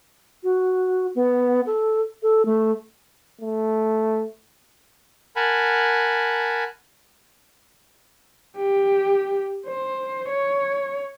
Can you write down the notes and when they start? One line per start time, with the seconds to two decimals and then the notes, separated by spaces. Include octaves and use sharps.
0.43 F#4
1.15 B3
1.66 A4
2.23 A4
2.45 A3
3.41 A3
5.36 A#4 F#5 G#5 A5 B5
8.57 G4
9.68 C5
10.29 C#5